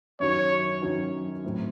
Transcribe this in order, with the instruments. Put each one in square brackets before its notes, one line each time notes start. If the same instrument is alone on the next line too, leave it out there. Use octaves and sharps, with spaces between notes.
[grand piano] F#2 D#3 F#3 C#4 F#4 [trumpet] C#5
[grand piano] F#2 D#3 F#3 C#4 F#4
A2 F#3 C4